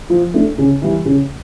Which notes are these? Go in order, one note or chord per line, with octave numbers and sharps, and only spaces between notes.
F3
A3 D4
C#3
E3 G3
C#3